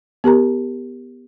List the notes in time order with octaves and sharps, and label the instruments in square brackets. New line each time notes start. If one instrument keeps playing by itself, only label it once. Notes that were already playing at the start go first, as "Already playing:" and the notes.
[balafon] B3 G4 A#4 A#5